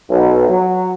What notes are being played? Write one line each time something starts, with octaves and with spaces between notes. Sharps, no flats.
B1
F#3